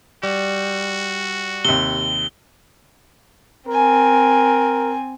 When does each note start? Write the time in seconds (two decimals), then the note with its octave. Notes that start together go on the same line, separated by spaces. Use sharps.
0.23 G3 F#4
1.65 D#2 C3 G7
3.68 C4 A#4 G#5